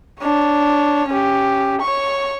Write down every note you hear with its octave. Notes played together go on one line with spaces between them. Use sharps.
D4 C#5
C#4 G4
C#5 C#6